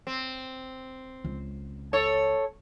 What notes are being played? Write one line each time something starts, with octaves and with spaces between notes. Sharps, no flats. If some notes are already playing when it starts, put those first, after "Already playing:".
C4
C#2
A4 C#5